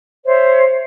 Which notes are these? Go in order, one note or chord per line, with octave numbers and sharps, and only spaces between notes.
C5 C#5 E5